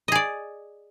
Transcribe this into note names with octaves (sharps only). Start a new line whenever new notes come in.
G#4 D5 D#5